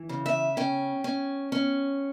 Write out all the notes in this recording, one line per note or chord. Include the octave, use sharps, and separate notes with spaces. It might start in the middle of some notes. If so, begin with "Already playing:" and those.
Already playing: E3
C#3
E5
C#4 G5
C#4
C#4